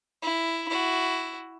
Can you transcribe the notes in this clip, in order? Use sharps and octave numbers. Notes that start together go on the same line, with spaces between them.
E4
E4 F#4